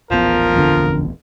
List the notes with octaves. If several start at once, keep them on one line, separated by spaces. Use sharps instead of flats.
D#1 A1 F3 B3 A#4
F2 D3